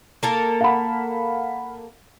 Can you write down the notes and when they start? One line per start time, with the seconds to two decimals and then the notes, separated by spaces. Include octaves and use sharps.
0.23 A#3 A4 A#4
0.61 F5 F#5 B5